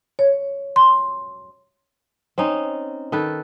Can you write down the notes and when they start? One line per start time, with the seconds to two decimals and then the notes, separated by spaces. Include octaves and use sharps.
0.19 C#5
0.76 C6
2.38 C4 C#4 D#4
3.12 D#3 A4 B4